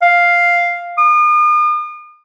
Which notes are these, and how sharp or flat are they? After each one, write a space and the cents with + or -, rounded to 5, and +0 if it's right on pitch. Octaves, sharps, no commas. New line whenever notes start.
F5 +0
D#6 -40